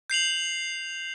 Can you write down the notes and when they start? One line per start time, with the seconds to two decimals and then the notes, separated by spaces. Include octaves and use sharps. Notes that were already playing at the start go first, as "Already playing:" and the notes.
0.10 G6 C7 F7 F#7